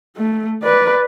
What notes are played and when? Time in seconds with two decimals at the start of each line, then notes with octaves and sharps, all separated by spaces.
0.17 A3
0.63 B4 D5